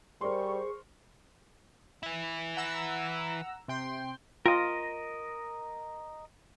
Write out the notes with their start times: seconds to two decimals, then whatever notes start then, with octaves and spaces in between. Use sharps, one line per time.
0.21 G3 G#4 A#4 C5 D5 C6 C#6
2.03 E3 E4
2.57 F#5 A#5 E6
3.68 C3 G5 C6
4.46 F4 A#4 D#5